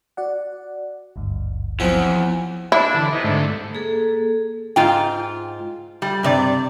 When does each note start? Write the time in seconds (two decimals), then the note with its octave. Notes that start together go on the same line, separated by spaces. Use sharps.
0.17 F#4 D5 F#5
1.16 G#1 D2 G2
1.80 E2 F3 F#3 C4
2.72 D4 E4
2.94 D3 E3
3.12 C3 E3 D#4
3.24 G#2 D3 A3
3.74 A#3 G#4 A4
4.76 G#2 F4 G5
6.02 G3
6.23 G2 C3 D5